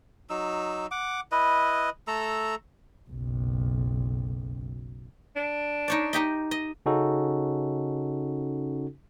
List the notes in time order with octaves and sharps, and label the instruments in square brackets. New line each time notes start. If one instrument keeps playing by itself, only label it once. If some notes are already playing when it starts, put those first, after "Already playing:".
[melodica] F#3 D#4 E6
F#5 D6
E4 B4 D#5
A3 A4 A#5 E6
[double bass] F#1 B1
[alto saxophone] D4
[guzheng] D#4 C#5 D5
D#4 G4 D#5
D#5
[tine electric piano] C#3 C#4 D#4 F#4 A4